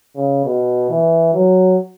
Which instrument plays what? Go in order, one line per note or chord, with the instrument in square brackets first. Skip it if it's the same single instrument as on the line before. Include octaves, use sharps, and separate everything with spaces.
[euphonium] C#3
B2
E3
F#3